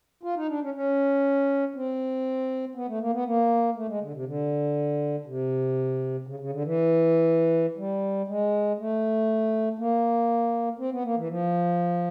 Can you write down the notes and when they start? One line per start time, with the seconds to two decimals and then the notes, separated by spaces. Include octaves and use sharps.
0.23 F4
0.36 D#4
0.49 D4
0.62 C#4
0.74 C#4
1.75 C4
2.75 B3
2.88 A3
3.00 A#3
3.13 B3
3.25 A#3
3.75 A3
3.88 G#3
4.01 D3
4.13 C3
4.26 D3
5.26 C3
6.27 C#3
6.40 C#3
6.52 D3
6.64 E3
7.77 G3
8.27 G#3
8.79 A3
9.78 A#3
10.79 C4
10.92 B3
11.04 A#3
11.17 E3
11.29 F3